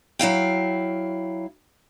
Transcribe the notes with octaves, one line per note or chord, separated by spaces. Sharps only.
F#3 E4 F5 G5